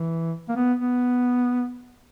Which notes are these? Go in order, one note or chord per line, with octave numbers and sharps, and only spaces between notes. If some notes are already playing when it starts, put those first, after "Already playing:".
Already playing: E3
A#3
B3
B3